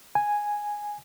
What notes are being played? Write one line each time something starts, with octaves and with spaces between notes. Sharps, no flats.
G#5